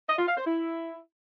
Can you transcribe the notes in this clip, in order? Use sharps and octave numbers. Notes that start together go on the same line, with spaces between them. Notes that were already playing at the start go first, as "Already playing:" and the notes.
D#5
F4
F5
C5
E4